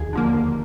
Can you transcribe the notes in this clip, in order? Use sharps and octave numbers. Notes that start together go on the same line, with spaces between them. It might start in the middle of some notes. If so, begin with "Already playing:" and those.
Already playing: D#2 G#4
D3 F3 A#3
D#2